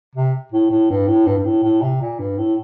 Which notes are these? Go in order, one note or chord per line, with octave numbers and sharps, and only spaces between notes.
C3
A2
A2
G2
A2
G2
G2
A2
A2
C3
A#2
G2
A2